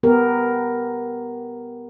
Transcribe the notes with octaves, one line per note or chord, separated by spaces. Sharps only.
B3 G4 A#4